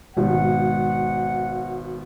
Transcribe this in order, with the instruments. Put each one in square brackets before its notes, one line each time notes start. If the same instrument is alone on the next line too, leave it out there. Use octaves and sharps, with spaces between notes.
[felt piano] G#1 B2 [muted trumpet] F#5